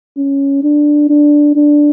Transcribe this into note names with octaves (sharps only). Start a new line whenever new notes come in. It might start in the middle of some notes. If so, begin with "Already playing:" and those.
C#4
D4
D4
D4